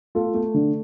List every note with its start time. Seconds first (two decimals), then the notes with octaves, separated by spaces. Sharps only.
0.15 A3 F4 A4
0.34 A3
0.54 D3